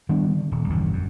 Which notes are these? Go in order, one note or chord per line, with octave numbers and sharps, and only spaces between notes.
D#3 G3 B3 D4
D3
D#1
G1 E2 B2
F#2